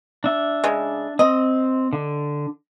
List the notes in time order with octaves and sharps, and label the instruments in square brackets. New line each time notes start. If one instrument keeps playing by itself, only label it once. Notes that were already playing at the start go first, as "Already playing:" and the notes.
[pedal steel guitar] D4 E5
[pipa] C#3 G#3
[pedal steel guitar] C4 [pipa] D#5
[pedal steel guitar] D3